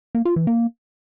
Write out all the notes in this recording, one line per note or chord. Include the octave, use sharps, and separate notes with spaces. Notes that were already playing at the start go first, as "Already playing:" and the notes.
A#3
F4
E3
A#3